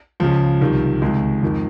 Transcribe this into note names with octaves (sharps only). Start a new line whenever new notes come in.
C#2 C#3 F3
C2 C3 D#3
C#2 C3 D#3 G#3
F2 D#3